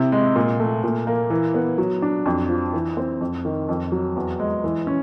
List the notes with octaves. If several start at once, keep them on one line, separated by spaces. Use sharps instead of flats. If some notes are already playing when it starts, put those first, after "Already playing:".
Already playing: C3 E4
G#3
A#2
A3
A#2
A#3
E3
B3
F#3
D4
F2
F3
E3
C4
F2
D#3
F2
F#3
E2
G#3
E3
C#4